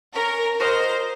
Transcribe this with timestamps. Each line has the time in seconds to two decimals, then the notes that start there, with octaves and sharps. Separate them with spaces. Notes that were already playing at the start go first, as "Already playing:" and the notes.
0.15 C#4 A#4
0.60 F#4 A#4 C5 D#5